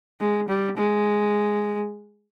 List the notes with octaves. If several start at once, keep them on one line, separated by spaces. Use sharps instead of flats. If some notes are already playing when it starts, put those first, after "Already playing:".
G#3
G3
G#3